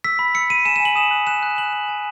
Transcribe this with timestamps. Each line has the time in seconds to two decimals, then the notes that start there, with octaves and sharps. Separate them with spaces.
0.04 E6 B6
0.19 B5
0.34 E6 C#7
0.50 B5 D#7
0.65 G#5 E7
0.76 E7
0.80 G#5
0.85 F#7
0.96 D#6 E7
1.11 F#6
1.27 F#6 E7
1.43 F#6
1.58 F#6 F#7
1.73 F#6
1.88 G#5